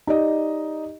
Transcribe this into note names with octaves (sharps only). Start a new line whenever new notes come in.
D#4 G4 D5 D#5